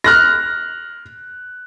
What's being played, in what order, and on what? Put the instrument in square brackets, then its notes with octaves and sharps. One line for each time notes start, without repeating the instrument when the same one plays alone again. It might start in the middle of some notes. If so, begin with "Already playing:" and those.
[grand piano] F6 F#6 A#6